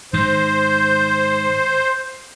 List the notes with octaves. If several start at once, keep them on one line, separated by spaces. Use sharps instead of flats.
G#2 D#3 C5